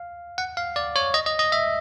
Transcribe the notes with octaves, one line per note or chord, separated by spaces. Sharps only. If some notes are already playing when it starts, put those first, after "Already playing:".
Already playing: F5
F#5
F5
D5
C#5
D#5
D#5
D#5
E5